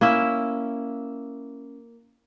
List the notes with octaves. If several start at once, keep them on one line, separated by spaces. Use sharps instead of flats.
A#3 C#4 E4 E5